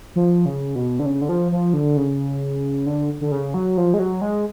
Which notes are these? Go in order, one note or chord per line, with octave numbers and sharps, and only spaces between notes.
F3
C#3
B2
D3
C#3
D3
F3
F3
D3
C#3
D3
D3
C#3
F#3
F3
G#3
F#3
G#3